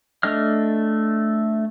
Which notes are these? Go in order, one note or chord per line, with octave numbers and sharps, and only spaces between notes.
A3 D4 D#5 F6